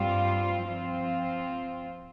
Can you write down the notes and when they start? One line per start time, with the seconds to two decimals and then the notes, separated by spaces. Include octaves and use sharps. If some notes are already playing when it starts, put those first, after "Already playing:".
Already playing: G2 G3 C4 F4
0.65 F3 C4 F4